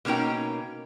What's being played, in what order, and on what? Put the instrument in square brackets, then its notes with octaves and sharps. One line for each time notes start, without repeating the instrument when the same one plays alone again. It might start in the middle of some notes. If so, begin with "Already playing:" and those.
[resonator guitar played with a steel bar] B2 A#3 C#4 D#4 G5